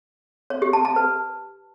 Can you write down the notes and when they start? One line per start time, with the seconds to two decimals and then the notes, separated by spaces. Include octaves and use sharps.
0.50 C#5
0.62 G4
0.73 A5
0.85 A5
0.96 B4